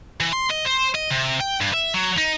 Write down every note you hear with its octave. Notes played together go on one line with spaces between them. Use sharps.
E3
C6
D#5
C5
D#5
C3
G5
G2
E5
F#3
D#4